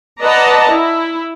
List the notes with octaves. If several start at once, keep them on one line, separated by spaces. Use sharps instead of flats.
B4 D5 D#5 F#5 A5 A#5
E4